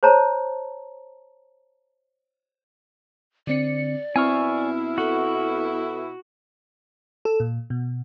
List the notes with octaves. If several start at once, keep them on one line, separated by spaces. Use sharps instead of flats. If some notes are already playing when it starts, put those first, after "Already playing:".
C5 C#5 A5 A#5
D3 C4 D5 C#7
B2 B3 C4 E4 G#5 C#6 F6
F#4 A4
A4
A#2
B2